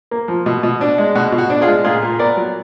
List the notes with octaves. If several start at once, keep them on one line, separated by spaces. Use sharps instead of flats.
A#3
F3
B2
B2
D4
G#3
B2 F#4
B2
F#4
D4
F4 G#4
G#3
A#2 F4 G#4
A#2
B3 A#4 D5
F#3